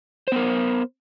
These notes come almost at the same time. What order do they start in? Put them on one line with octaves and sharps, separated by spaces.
C5 B3 A#4